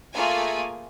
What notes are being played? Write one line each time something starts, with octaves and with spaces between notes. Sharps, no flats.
A3 A#3 F4 G#4 G#5